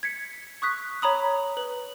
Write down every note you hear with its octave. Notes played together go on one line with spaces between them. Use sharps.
G#6 B6 C#7
C#6 D#6 F#6 B6
C#5 A#5 B5 D#6
B4 F#7